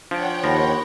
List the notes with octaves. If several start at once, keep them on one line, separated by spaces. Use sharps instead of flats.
F3 D4 C#5 F#5 G5 D7
D#2 F3 B5 A#6